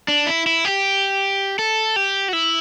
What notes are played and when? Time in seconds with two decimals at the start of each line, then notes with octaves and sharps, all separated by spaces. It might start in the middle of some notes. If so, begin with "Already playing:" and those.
0.08 D4
0.27 E4
0.47 E4
0.65 G4
1.59 A4
1.96 G4
2.28 F#4
2.33 E4